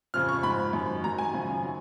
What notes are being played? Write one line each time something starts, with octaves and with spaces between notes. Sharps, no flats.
F2 C#3 F3 F6
C#6
G#2 F3 B5
F#2 D#3 F#3
F#2 D#3 F#3 A#5
G#5
F#2 C#3 F3
D#3 F#3